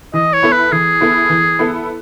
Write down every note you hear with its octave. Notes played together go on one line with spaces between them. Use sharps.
E3 D#5
C#5
B3 E4 A4
B4
E3 G#4
B3 E4 A4
E3
B3 E4 A4